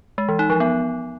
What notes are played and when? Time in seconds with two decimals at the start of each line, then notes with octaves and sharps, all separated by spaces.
0.18 G#3
0.29 E3
0.39 D#4
0.50 F3
0.60 B3